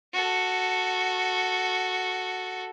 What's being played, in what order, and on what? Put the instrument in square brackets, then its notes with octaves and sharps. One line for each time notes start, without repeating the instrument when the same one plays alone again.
[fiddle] F#4 A4